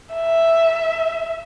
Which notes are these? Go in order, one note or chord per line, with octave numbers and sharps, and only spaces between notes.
E5